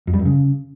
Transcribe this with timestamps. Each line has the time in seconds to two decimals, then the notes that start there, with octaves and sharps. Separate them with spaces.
0.07 F2
0.13 G3
0.19 F#2
0.25 C#3